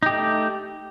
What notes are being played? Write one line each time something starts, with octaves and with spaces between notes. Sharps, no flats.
A3 D#4 G4